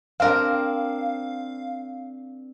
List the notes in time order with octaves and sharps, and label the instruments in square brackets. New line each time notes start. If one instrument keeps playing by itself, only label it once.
[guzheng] C4 D4 A#4 [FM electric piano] F5